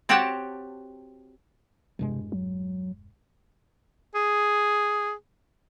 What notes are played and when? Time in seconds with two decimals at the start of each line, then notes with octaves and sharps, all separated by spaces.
0.09 C4 F#4 G4 C#5 F#5 A5
1.99 E1 G2 C3 G#3
2.32 F#3
4.15 G#4